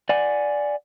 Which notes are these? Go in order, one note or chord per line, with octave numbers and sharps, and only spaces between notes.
D5 F#5 G#5